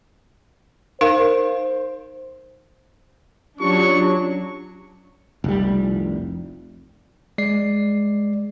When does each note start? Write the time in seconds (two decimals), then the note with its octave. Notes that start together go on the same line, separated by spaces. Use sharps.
1.01 D#4 A#4 C5 F5
3.60 F#3 C#4 D4 F4 G4 C#6
5.44 F1 C2 G3
7.38 G#3 D5 C7